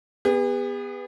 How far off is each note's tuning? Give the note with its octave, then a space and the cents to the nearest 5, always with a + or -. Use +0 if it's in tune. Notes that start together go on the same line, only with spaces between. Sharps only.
B3 +0 G#4 -45